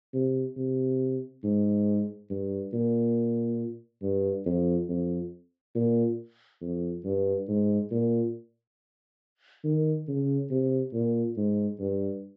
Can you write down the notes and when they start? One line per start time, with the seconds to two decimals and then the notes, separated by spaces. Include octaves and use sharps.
0.14 C3
0.57 C3
1.44 G#2
2.30 G2
2.73 A#2
4.02 G2
4.46 F2
4.89 F2
5.75 A#2
6.62 F2
7.05 G2
7.49 G#2
7.92 A#2
9.64 D#3
10.08 C#3
10.51 C3
10.94 A#2
11.37 G#2
11.80 G2